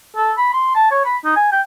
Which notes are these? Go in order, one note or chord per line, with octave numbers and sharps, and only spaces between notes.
A4
B5
C6
A5
C#5
B5
D#4
G#5
G5